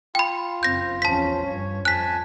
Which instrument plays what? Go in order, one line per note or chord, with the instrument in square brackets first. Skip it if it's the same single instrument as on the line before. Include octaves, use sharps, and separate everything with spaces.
[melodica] F4 [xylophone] G5 B5
[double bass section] F#1 C4 [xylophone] G6 A#6
[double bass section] E2 F3 C#4 [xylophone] A5 B6
[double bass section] G2 [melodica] C#5
[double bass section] F2 [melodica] G#5 A5 [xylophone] F#6 B6